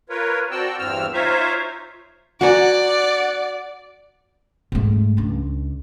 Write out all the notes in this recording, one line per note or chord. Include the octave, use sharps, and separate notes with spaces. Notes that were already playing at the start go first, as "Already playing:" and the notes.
F4 A#4 B4 C#5
C4 F#4 D5 G5 A5 E6
E2 G2 E3 C4 E6 F6
D#4 F4 C5 C#5 E5 F5
F#4 D5 F#5 G#5 A#5
G#2 A3
C#2 D4